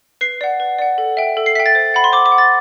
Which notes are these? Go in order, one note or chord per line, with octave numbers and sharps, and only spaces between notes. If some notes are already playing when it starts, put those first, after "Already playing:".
B4 C7
D5 F#5
B4
D5 F#5
A4
E5 G5
A4
C7
E5 G5 B6
A6
C5
F#5 B5
C6
C5 D6
D6
F#5
A6